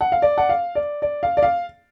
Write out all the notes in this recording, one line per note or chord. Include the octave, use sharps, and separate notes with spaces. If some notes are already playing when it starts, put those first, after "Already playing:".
F#5
F5
D5
F#5
F5
D5
D5
F5
D5
F5